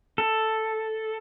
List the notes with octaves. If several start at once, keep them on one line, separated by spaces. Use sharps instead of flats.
A4